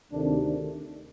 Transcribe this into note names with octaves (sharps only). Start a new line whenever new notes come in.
D2 C3 D#3 A3 D4